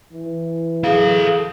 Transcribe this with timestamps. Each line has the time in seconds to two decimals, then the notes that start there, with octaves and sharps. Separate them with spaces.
0.13 E3
0.84 G#4 A4 F5